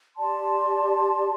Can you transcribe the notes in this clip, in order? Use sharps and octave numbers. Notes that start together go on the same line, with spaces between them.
G4 D5 A5 C6